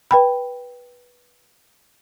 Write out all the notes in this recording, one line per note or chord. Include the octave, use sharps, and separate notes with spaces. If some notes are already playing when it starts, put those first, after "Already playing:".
B4 G5 B5